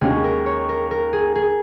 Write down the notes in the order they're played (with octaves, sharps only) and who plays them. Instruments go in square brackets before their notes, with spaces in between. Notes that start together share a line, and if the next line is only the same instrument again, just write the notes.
[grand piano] D#2 D#3 G#3 C#4 F#4 [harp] G#4
[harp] A#4
C#5
A#4
A#4
G#4
G#4